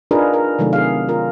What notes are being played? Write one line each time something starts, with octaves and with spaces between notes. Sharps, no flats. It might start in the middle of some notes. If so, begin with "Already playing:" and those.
D4 D#4 F4 G#4 A#4 B4
A#4
C3 D#3 F#3 A3
G#4 F5
F4 A#4